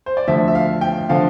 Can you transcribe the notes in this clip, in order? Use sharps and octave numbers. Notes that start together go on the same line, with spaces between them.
C5
D5
D2 D3 F3 E5
E5
F5
G5
D3 F3 F5